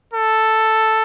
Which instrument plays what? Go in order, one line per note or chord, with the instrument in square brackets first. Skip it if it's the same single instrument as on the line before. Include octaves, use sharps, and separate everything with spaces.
[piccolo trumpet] A4